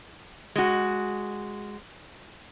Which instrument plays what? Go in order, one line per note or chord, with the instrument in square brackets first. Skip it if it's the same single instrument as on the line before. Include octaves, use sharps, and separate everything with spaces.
[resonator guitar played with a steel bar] G#3 F#4